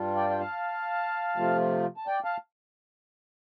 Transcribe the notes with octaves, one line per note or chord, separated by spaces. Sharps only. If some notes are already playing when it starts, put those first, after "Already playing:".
Already playing: G2 G3 D4 F4
D5 G5
G5
F5 A5
C3 F3 A3 F4
A5
D5 G5
F5 A5